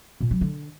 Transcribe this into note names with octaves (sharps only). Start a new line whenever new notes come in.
A#2
F#3
D3